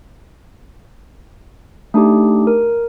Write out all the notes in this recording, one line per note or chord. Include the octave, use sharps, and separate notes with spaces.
A3 D4 D#4 G4
A#4